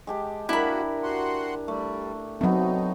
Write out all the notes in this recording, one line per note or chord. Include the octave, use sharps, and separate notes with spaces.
G#3 G4 A5
A#3 D4 E4 F#4 A#4 B5
F#4 F#5 C6
G3 A3
F#3 A3 B3 C4 D#4